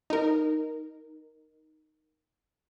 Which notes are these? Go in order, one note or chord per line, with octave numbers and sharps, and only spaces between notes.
D#4 A#4